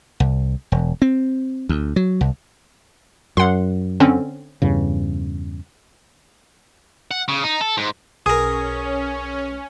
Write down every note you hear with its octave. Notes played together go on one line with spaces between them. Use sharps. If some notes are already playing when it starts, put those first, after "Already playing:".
C2
E1
C4
D2
F#3
C2
F#2 F#5 C6
D3 C4 C#4
E2 G2 C#3
F#5
C#3
D#4
A4
G#2
B1 C#4 G#4 A#4 D#6